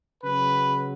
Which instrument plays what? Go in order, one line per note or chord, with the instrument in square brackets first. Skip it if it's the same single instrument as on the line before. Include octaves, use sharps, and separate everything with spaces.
[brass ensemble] C#3 F#3 B4